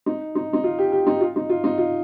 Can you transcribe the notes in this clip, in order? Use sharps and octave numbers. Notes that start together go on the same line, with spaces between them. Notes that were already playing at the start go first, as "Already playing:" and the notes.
D#4
D#4
D#4
F4
G4
G4
D#4
F4
D#4
F4
D#4
F4